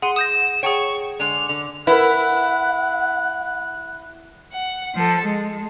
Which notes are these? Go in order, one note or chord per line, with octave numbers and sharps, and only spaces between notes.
G#4 F#5 C6 D#7
D#6 G6 A#6 E7
G#4 C#5 F#5 G5 A5 C#6
D3 G#3 F7
D3
E4 A#4 B4 F#5 F#6
F#5
F3 A4
G#3